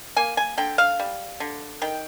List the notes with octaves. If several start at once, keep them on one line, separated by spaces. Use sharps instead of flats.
A#3 G#5
G#5
D3 G5
F5
G3
D3
D#3 G5